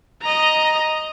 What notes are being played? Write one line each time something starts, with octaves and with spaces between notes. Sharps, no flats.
D#5 A#5